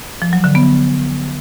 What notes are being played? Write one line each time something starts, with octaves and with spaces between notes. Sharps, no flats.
F3
F#3
D3
B3